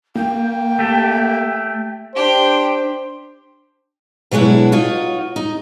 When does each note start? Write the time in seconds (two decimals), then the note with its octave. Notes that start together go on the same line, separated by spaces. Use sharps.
0.15 A#3 G5
0.79 A3 G4
2.15 D4 G4 C5
4.31 B2 F#3 G#3 D4 E4
4.72 D#4 F4 F#4 C#5
5.36 D#4